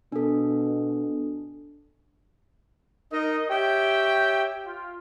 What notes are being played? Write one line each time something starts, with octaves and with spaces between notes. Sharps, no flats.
B2 D4 A4
D#4 A#4 D#5
G4 C#5 E5 G5
F4